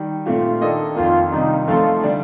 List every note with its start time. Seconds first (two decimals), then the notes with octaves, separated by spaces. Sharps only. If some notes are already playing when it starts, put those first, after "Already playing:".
Already playing: D#3 G3
0.26 A#2 A3 C4 F4 G4
0.61 D#3 A#3 D4 A4 D#5
0.96 F2 D#3 A#3 F4
1.31 C3 D#3 G3 D4 D#4
1.67 F3 A3 C4 D#4 F4 A4
2.03 D3 G3 D4